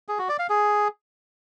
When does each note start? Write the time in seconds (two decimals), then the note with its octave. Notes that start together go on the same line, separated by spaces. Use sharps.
0.08 G#4
0.19 F#4
0.29 D5
0.39 F5
0.49 G#4